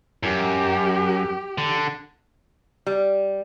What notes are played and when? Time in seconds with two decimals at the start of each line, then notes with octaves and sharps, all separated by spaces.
0.23 F#2 G4
1.58 D3
2.87 G3